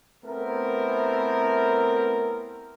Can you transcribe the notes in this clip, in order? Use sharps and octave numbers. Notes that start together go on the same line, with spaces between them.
A3 B3 C4 E4 A#4